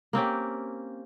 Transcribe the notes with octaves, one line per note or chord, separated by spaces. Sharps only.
A#3 C4 C#4 G4